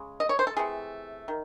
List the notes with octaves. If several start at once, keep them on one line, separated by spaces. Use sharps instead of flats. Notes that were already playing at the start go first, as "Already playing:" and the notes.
Already playing: C#3 G#3
D#5
C#5
C5
A4
C3 E3 A3 G#4
D#3